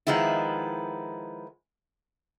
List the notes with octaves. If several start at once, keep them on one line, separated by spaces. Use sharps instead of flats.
D#3 F3 G#3 B3 E4